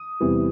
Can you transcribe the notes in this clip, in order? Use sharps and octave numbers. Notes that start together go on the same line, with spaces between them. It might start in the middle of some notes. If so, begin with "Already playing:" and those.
Already playing: D#6
E2 C3 E3 G3